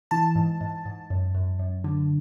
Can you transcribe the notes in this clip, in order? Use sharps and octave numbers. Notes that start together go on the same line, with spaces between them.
E3 A5
G#2
G#2
G#2
F#2
F#2
F#2
D3